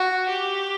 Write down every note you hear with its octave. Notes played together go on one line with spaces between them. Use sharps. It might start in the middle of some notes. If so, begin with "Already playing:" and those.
Already playing: F#4
G4